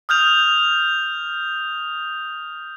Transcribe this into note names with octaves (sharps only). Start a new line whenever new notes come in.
D#6 F6 G6 F7